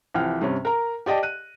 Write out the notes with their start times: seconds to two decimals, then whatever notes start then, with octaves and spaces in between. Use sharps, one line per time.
0.14 C2 E3 F3 G5 F6
0.42 G2 C3 C#4
0.65 A#4 A#5
1.06 G4 D5 D#5 G5 A5
1.23 F#6 D#7